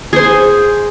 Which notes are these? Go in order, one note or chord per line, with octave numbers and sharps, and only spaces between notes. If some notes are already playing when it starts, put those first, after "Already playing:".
G#4 C5